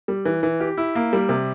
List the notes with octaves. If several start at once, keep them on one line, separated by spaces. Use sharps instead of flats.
G3
E3
E3
G4
E4
A#3
G3
C3